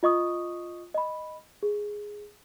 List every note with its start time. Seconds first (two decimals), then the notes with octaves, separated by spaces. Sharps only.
0.03 F4 D#5 C#6 D#6
0.94 D#5 B5
1.63 G#4